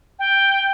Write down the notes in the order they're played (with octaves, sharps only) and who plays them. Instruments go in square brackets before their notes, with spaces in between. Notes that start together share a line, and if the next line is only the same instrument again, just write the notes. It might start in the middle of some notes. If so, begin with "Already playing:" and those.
[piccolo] G5